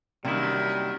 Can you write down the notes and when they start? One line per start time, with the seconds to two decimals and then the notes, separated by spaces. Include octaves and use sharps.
0.25 F#2 C3 D#3 G3 A#3 E4